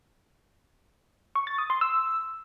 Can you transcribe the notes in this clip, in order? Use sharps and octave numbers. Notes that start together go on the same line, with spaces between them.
C#6
A6
D#6
C6
E6